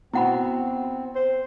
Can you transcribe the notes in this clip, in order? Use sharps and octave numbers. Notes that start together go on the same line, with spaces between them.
B2 C4 E4 F#4 F#5 B5
C5